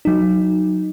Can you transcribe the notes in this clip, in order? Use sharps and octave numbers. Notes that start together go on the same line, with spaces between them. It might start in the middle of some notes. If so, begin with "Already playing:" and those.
F#3 D#4